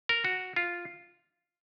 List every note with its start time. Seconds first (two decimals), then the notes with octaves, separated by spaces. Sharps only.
0.09 A#4
0.24 F#4
0.56 F4